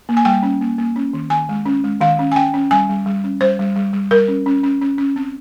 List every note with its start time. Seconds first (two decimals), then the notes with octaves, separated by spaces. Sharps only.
0.09 A#3
0.17 G#5
0.25 G3 G5
0.43 C#4
0.61 A#3
0.78 A#3
0.96 C#4
1.13 D#3
1.30 D#3 G#5
1.49 G#3
1.66 C#4
1.84 G#3
2.01 D#3 F5
2.19 C#4
2.32 G#5
2.35 C#4 G5
2.54 C#4
2.71 G3 G#5
2.89 G3
3.06 G3
3.24 C#4
3.41 G3 C5
3.59 G3
3.76 G3
3.93 G3
4.11 G3 A#4
4.28 C#4
4.46 C#4
4.64 C#4
4.81 C#4
4.98 C#4
5.16 C4